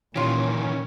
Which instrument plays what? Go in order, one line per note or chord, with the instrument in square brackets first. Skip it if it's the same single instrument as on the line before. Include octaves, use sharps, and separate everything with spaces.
[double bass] A#2 [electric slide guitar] D#3 E3 [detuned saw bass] C#4 [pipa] F4 G4